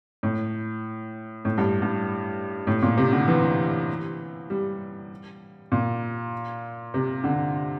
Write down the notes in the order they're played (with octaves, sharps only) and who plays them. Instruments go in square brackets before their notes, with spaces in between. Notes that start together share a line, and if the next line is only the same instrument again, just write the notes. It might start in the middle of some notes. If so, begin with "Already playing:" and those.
[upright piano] A2
A2
G2
G2
A2
A#2
C3
D3
E3
G3
A#2
C3
D3